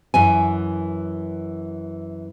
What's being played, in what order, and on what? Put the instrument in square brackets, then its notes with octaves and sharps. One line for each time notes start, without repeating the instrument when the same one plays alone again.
[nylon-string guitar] F#2 E3 G#5